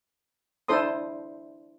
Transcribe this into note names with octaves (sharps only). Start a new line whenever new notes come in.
D4 E4 A4 C5 C6 D#6